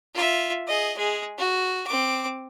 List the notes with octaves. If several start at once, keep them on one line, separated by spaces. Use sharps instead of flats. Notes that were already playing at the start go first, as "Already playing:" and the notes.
F4 E5
G#4 D#5
G#3 G#4
F#4
C4 D6